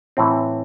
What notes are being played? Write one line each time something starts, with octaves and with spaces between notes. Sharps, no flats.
A2 E3 C4